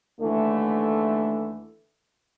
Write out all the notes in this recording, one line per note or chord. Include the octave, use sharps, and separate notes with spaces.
D#2 D3 E3 A3